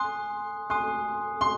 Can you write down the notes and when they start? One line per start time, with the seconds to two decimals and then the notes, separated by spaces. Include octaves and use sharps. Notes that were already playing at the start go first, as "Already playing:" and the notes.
Already playing: G#5 C6 D#6 F#6
0.70 G#5 C6 D#6 F#6
1.41 C6